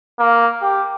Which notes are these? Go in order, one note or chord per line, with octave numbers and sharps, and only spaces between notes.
A#3
G4